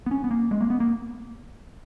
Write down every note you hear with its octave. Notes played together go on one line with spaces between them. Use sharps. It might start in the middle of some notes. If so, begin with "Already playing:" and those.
B3
C#4
B3
A#3
G#3
A#3
B3
A#3